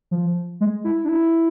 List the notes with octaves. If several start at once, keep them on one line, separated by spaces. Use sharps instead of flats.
F3
G#3
E4
D4
E4